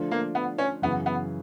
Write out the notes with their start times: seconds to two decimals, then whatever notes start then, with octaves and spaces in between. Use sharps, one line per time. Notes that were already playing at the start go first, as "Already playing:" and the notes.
Already playing: D3 F3 A3 D4 F4
0.11 A#3
0.35 B3
0.58 C#4
0.82 F#2 C#3 E3 B3
1.06 B3